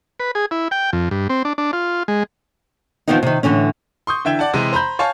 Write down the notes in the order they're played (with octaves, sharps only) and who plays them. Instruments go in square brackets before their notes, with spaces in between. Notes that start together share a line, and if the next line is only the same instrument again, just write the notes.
[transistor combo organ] B4
G#4
E4
G5
F2
G2
C4
D4
D4
F4
G#3
[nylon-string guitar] D#3 F3 G3 B3 C4 D#4
C3 D#3
A2 D3 E3 C#4
[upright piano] C6 C#6 D#6 G6
D3 E3 E5 G5 G#6 E7
D5 F#5 A5
C3 E3 G#3 E4
C5 A#5 B5 G6
C#5 F5 G#5 A5 C#6